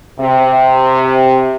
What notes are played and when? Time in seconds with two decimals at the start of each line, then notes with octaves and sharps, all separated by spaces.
0.19 C3